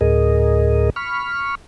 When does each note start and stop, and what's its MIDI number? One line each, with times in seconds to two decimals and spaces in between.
0.01 0.90 38
0.01 0.90 45
0.01 0.90 68
0.01 0.90 70
0.01 0.90 75
0.96 1.55 83
0.96 1.55 85
0.96 1.55 89